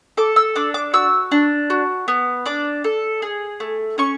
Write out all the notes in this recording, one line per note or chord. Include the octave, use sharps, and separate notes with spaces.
A4 D6
E6
D4 D6
D6
F#4 E6
D4
F#4
B3
D4 D6
A4
G#4
A3
C#4 C#6